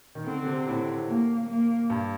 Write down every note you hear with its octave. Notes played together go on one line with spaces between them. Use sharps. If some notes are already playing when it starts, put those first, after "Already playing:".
D#3
D3 C4
D3
C3
A2
A#3
A#3
G2